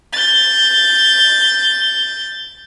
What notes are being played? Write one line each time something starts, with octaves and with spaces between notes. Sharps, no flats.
G6 A6